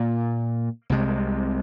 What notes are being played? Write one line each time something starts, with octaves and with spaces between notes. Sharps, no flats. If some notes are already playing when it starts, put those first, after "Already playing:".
Already playing: A#2 A#3
C2 C3 G#3